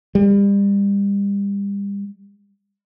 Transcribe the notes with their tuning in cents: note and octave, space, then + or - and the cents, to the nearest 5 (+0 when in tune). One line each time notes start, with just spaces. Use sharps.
G3 +35